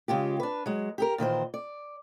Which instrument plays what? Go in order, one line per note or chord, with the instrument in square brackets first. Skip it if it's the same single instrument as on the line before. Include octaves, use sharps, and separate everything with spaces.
[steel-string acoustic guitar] C#3 G#3 F4 G4
D4 B4
F#3 G#3
G4 G#4 A#4
A#2 D#3 E3 C5
D5